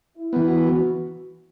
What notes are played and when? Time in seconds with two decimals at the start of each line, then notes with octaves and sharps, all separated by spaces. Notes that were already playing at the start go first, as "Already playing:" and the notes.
0.17 E4
0.33 E3 B3
0.47 F#4